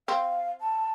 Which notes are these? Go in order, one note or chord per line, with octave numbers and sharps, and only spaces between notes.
C4 F5
A5